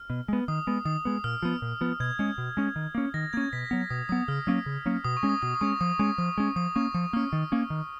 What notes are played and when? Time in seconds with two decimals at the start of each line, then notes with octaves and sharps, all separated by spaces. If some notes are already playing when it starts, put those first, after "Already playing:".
Already playing: F6
0.10 B2
0.29 G#3 B3
0.48 D#3 D#6
0.67 G#3 B3
0.85 D#3 D#6
1.05 G#3 B3
1.24 A#2 F6
1.42 F3 B3
1.62 A#2
1.81 F3 B3
2.00 B2 G#6
2.19 G#3 C#4
2.38 B2
2.57 G#3 C#4
2.76 D#3
2.95 A#3 C#4
3.14 D#3 A#6
3.33 A#3 C#4 G#6
3.53 B2 B6
3.71 F#3 B3
3.90 B2 D#6
4.09 F#3 B3 D#6
4.28 C#3 F6
4.47 F#3 A#3 C#4
4.66 C#3
4.86 F#3 A#3 C#4
5.04 B2 D#6
5.17 C#6
5.23 G#3 C#4
5.29 D#6
5.42 B2 D#6
5.55 D#6
5.61 G#3 C#4 C#6
5.81 F3 D#6
5.99 G#3 C#4 C#6
6.18 F3 D#6
6.38 G#3 C#4
6.56 F3 D#6
6.75 A#3 C#4 C#6
6.94 F3 D#6
7.13 A#3 C#4 F6
7.33 D#3
7.52 A#3 C#4
7.70 D#3